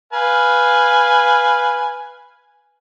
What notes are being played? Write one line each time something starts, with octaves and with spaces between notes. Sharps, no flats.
B4 F5 G#5